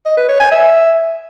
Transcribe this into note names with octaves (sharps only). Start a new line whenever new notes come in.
D#5
B4
C#5
G#5
E5